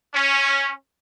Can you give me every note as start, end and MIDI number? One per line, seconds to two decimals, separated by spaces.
0.14 0.71 61